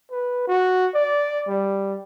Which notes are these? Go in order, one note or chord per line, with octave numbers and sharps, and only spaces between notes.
B4
F#4
D5
G3